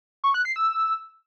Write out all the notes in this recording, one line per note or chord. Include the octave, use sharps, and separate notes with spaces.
C#6
F#6
C7
E6